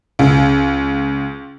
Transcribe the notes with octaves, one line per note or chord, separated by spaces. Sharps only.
C#2